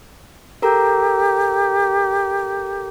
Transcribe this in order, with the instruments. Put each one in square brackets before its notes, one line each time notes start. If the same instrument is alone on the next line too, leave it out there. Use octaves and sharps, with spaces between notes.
[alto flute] G4 [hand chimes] A4 A#4 A#5